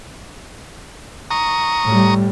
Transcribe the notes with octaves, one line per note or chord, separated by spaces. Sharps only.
A#5 C#6 D#6
A2 G3